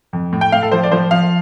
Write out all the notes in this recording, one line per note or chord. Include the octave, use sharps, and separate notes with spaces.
F2
A2
G5
A2 F5
A4
F3 C5
D5
F3 C5
F3 F5